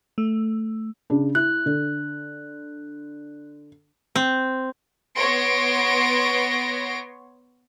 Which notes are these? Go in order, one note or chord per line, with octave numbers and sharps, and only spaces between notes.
A3
C#3 D4
E4 F#6
D3
C4
B3 C#5 C6 A#6 D7